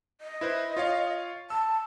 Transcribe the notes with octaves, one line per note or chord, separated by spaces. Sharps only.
D#5
E4 B4 C5
F4 C#5 F5
A5 E6